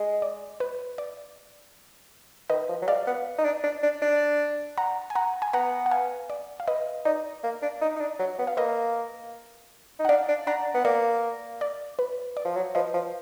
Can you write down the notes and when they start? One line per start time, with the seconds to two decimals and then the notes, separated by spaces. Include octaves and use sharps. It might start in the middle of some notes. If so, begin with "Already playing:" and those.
Already playing: G#3
0.22 D5
0.60 B4
0.98 D5
2.50 D#3 B4 D#5
2.69 F3
2.82 F#3
2.87 G#3 D5 F5
3.07 B3
3.38 D#4
3.45 D4
3.64 D4
3.83 D4
4.02 D4
4.78 F#5 A#5
5.10 G#5
5.15 F#5 A#5
5.42 G#5
5.53 B3 F#5 A#5
5.86 F#5
5.91 F5 G#5
6.30 D5
6.60 F5
6.68 B4 D#5
7.05 D#4 D5
7.43 A#3
7.62 D4
7.81 D#4
7.96 D#4
8.01 D4
8.19 F#3
8.39 B3
8.47 F5
8.57 A#3 B4 D#5
9.99 D#4
10.05 F#5
10.09 D4 D5 F5
10.28 D4
10.47 D4 F#5 A#5
10.75 B3
10.85 A#3 D5
11.61 D5
11.99 B4
12.37 D5
12.45 F3
12.56 F#3
12.75 F3 B4 D#5
12.94 F3